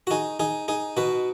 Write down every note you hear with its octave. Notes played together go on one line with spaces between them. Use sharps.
F#4
D#4 G#4
D#4 G#4
D#4 G#4
B2 F#4 B4